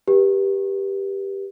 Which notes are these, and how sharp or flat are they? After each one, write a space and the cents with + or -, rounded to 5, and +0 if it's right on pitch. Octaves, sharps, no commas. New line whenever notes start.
G4 +0 B4 -35